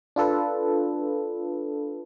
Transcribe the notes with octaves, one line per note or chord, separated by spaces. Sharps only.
D4 F4 A4 B4